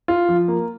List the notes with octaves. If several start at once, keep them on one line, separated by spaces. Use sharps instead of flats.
F4
F3
A#3